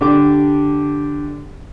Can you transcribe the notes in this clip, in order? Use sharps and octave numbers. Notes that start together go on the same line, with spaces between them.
D3 D4 G4 D6